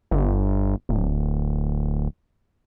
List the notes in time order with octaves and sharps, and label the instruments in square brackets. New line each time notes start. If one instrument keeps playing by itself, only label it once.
[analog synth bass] G1
D1